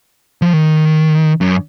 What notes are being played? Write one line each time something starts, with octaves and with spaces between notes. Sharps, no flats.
F3
D#3
F#2